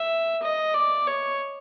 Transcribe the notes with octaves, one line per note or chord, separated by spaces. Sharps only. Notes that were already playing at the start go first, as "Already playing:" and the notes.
Already playing: E5
D#5
D5
C#5